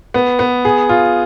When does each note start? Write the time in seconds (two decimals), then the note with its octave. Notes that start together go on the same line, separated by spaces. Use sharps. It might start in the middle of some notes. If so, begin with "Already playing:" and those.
0.14 B3
0.39 B3
0.65 G#4
0.89 F4